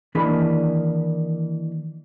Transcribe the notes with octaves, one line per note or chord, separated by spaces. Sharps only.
D#3 E3 A#3 D4 G#4 B5